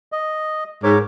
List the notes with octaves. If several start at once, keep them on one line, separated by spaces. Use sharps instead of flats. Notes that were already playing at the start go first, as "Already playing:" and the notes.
D#5
G#2 A#4 C#5 D6